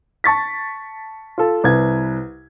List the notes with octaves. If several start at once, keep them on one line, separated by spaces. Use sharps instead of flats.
A5 C#6 A6 B6
F4 A4
C2 B4 G#6